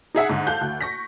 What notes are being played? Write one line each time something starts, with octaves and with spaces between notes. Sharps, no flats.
D#4 G#4 E5 F#5
G#2 D3
A4 F5 A5 F#6 G6
D2
C#6 A#6 B6